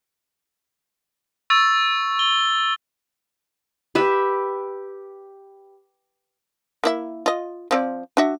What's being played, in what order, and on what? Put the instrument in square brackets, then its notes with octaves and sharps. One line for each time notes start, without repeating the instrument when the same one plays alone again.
[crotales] C#6 E6 A6
G7
[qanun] G4 B4 E5
[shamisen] A#3 E4 E5
F4 D#5
F3 C4 D5
D4 F#4 E5